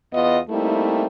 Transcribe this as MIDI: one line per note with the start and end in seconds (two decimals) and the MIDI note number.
0.14 0.38 40
0.14 0.38 59
0.14 0.38 65
0.14 0.38 75
0.49 1.05 55
0.49 1.05 57
0.49 1.05 58
0.49 1.05 60
0.49 1.05 63
0.49 1.05 64